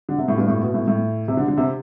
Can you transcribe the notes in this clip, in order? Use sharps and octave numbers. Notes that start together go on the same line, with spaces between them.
D3
C3
A2
G2
A2
B2
A2
A2
C3
D3
D3
C3